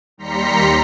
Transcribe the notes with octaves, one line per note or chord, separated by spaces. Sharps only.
D#2 G3 A#5 C6 B6 C#7